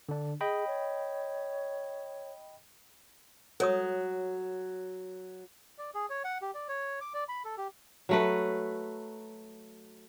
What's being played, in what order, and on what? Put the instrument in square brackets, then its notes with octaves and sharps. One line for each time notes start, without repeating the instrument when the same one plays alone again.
[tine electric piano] D3 D4
[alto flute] G#4 [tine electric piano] D#5 G5 B5
[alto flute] C#5
[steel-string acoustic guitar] F#3 [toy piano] A4 C#5 D#6
[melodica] D5
G#4
C#5
F#5
G4
D5
C#5
D6
D5
B5
A4
G4
[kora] F#3 A3 B4